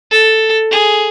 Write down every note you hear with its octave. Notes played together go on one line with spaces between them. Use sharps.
A4
G#4